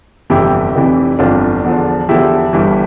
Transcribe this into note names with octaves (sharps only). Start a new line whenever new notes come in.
G1 F2 C3 E3 E4 G4
F1 F2 C3 E3
G1 F2 E3 D4 F4
E2 D3 F3
E2 D3 F3 E4 G4
G1 G2 E3